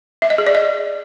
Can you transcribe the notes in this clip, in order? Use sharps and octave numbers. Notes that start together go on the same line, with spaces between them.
E5
D#5
G#4
D5
D#5